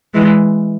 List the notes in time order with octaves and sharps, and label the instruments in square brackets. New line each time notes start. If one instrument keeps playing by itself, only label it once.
[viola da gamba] E3 G#3